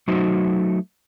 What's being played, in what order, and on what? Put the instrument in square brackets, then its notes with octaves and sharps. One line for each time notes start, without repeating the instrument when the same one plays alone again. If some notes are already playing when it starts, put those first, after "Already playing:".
[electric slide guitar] F#3 A3 D#4 F#4 C5